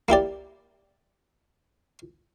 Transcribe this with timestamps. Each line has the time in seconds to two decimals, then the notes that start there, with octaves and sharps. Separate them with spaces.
0.09 A#3 E4 G4 D5